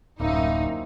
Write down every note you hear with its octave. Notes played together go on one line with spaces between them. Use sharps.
D1 F#2 A#3 C4 D#4 E4